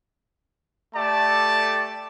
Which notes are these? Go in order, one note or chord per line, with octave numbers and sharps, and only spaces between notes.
A3 G4 A4 D5 A5